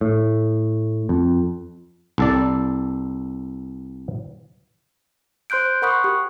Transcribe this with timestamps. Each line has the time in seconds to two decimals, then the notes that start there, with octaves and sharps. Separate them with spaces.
0.01 A2
1.09 F2
2.18 C2 A4 D5
5.50 C5 C6 F#6 G6 D7
5.82 A#4 F#5 B5 C#6 D#6 F#6
6.04 G4